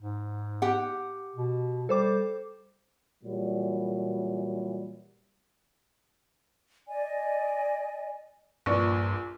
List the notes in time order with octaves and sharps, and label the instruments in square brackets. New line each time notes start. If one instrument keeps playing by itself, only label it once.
[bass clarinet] G#2
[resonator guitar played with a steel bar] G4 F#5
[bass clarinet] B2
[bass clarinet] G3 [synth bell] A4 C5 D6
[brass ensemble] A#2 E3 F#3 G3
[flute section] D5 D#5 G#5
[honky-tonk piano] A#1 A#2 [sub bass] G2 [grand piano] B4 D5 C#6